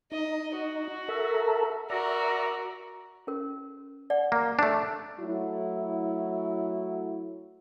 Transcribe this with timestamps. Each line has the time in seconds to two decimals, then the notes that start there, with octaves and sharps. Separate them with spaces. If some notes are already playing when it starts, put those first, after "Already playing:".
0.12 D#4 D#5
0.55 F#4
1.08 A4 A#4 E5
1.90 F#4 A#4 D5 E5 A#5
3.27 C#4 F#4 A#4
4.10 D5 F#5
4.32 A#3
4.59 A3 D4
5.19 F#3 A3 E4 F#4